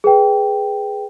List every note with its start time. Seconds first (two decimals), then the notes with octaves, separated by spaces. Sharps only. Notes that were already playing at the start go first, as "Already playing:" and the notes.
0.04 G#4 B4 G5